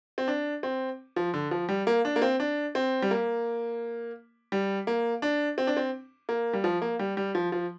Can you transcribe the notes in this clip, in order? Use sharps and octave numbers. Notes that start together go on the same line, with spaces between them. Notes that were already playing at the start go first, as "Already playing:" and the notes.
C4
D4
C4
F3
D3
F3
G3
A#3
D4
A#3
C4
D4
C4
G3
A#3
G3
A#3
D4
C4
D4
C4
A#3
G3
F3
A#3
G3
G3
F3
F3